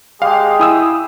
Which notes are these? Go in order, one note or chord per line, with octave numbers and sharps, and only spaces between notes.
G#3 G4 G#4 F5
E4 D#6 E6